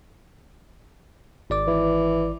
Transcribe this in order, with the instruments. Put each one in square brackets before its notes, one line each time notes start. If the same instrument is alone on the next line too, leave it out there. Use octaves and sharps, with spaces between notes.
[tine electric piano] G#1 D5 D6
[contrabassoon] E3